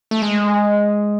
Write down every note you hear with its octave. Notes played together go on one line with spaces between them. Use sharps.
A3
G#3